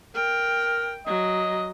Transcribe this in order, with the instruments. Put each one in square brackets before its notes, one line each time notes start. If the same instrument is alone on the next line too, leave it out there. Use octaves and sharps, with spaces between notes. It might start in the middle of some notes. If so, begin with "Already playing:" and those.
[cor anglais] A#4 [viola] G5
[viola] F#3 [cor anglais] D#5